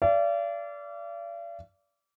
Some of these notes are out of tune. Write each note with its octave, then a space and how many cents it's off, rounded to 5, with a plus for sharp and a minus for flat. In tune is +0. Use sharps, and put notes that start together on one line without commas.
D5 -25 F5 -45